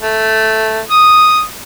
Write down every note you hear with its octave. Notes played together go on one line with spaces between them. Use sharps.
A3
D#6